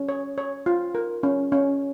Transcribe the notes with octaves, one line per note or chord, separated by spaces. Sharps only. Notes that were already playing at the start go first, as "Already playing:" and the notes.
Already playing: C#4
C#5
C#5
F4
A#4
C#4
C#4